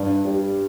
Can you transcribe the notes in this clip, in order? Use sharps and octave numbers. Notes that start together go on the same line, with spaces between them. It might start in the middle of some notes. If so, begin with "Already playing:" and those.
Already playing: G2
G3